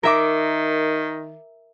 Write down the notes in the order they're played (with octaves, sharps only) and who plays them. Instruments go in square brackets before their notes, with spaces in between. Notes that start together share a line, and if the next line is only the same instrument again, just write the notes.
[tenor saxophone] D#3 [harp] A#4 E5 D6